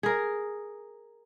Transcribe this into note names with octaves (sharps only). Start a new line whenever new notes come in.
G#4 A#4